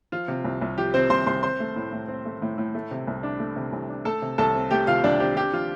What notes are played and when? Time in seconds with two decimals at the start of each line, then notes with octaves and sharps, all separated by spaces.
0.12 F3 F4
0.28 C3
0.45 C2
0.62 C2
0.78 F3 G4
0.94 C3 C4 C5
1.10 C2 C5 C6
1.26 C2 C5 C6
1.43 C4 C5 C6
1.60 A3
1.76 A2
1.93 A2
2.08 C4
2.25 A3
2.42 A2
2.58 A2
2.75 A3
2.91 C3
3.07 C2
3.23 D4
3.40 A3
3.56 C3
3.73 C2
3.89 D4
4.05 A3 A4 A5
4.22 C3
4.38 C2 A4 A5
4.55 C4
4.71 A3 G4 G5
4.87 C3 F4 F5
5.04 C2 D4 D5
5.20 C4 G4
5.36 D4 G4
5.53 F3 F4